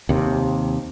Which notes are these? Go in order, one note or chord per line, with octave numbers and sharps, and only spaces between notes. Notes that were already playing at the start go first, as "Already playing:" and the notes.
D#2 C3